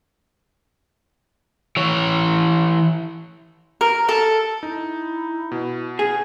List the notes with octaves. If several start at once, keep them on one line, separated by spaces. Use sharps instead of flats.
E3 C#5
A#4
A4
D#4 E4
B2
G#4